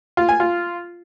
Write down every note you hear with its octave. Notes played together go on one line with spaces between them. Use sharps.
F4
G#5
F4